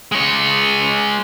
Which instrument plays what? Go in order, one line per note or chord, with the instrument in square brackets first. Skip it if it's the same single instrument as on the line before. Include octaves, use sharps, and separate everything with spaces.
[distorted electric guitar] G#3 C#5